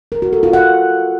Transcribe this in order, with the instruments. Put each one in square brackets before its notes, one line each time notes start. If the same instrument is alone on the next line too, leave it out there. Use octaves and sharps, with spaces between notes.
[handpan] A#4
F#4
A4
F4
F#5